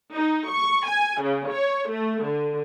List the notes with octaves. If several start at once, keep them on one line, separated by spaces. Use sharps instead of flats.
D#4
C#6
G#5
C#3
C#5
A3
D3